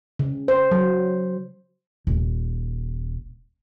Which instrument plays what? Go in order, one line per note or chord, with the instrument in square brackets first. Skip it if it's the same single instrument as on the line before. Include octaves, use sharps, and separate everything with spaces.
[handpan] C#3
C5
F#3
[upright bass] D#1